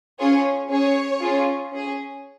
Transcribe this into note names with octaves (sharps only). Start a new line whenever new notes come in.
C#4 F4 G#4 C#5
C#4 G#4 C#5
C#4 F4 G#4
C#4 G#4